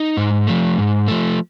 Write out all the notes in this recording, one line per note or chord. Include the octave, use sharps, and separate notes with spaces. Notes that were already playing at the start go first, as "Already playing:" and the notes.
Already playing: D#4
G#2
F3 A3
G#2
F3 A3